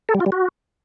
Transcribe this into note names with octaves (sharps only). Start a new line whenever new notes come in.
A4
G3
F4
G3
F#4